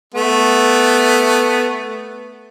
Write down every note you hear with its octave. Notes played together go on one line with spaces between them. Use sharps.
A3 B3